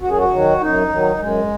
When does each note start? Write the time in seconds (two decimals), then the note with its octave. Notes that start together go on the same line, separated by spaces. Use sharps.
0.01 F#2 F#4
0.10 G#4
0.18 F#4
0.30 D#3 F#3
0.60 F#2 D#4
0.88 D#3 F#3
1.18 F#2 G#3